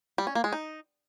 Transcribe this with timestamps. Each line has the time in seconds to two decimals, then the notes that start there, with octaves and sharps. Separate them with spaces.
0.18 G3
0.27 C#4
0.35 A#3
0.44 G#3
0.53 D#4